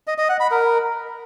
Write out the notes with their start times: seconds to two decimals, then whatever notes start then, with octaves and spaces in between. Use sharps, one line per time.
0.07 D#5
0.18 D#5
0.29 F#5
0.40 B5
0.51 A#4